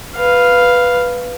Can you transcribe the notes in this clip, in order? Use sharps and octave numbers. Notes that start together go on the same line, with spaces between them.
B4 F5